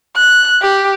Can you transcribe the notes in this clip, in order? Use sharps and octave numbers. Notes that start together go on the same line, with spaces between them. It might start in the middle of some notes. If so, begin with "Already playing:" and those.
F#6
G4